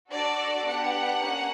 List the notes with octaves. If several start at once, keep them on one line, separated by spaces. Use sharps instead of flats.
D4 F#4 A4 D5
B3 D4 G4 F#5
A#3 C#4